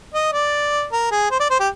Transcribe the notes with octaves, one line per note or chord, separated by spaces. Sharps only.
D#5
D5
A#4
G#4
C5
D5
C5
G4